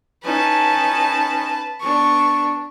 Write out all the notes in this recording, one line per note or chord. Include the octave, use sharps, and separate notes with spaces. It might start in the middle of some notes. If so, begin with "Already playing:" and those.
C#4 D#4 B4 A5
B3 D4 C#6